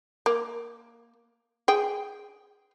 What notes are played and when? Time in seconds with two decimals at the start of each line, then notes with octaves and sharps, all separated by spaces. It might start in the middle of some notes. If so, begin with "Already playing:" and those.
0.26 A#3
1.68 G#4 G5